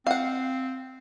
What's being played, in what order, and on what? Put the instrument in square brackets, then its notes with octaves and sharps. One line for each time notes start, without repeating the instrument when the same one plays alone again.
[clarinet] C4 [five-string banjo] F5 F#5